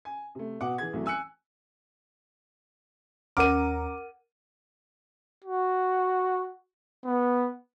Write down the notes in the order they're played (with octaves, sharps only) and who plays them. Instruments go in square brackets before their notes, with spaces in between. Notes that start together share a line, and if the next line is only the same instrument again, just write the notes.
[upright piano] G#5
C3 A3
B2 F#5 D6
E3 G#4 G#6
C2 E3 F#3 A3
G#5 E6 F#6 C#7
[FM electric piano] D#2 C#4 A#5 [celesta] A#4 F#5 F6 [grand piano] D6 D#7
[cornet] F#4
B3